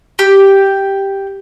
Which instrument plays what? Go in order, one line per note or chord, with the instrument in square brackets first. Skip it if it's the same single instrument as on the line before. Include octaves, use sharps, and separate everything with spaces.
[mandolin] G4